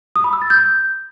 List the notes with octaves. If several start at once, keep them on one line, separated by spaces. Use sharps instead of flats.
D#6
B5
E6
A6
G6